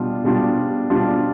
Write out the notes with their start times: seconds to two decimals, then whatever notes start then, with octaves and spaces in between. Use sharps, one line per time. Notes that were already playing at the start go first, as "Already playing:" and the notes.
Already playing: B2 G3 D4 F4
0.24 B2 G3 D4 F4
0.90 B2 G3 D4 F4